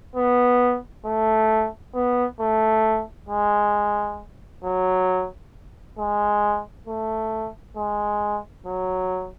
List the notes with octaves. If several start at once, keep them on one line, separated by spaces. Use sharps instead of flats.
B3
A3
B3
A3
G#3
F#3
G#3
A3
G#3
F#3